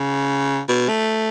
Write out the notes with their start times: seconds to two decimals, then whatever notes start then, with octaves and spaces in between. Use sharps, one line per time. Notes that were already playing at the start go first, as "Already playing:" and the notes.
Already playing: C#3
0.68 B2
0.88 A3